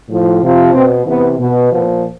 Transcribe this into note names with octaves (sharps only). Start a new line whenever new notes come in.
A2 F3
C3 F3
B2 C4
C3 E3 B3
B2
A#2 F3 B3